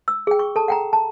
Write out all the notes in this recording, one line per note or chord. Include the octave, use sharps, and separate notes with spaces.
E6
G#4 G5
C#6
A4 A5
F#5 G5 A#5
A5